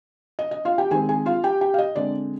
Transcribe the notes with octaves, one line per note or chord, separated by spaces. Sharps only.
D#5
D#5
F4 F5
G4 G5
D#3 G#3 C4 G#4 G#5
G#4 G#5
F4 F5
G4 G5
G4 G5
F5
D#5
D3 G#3 C4 D5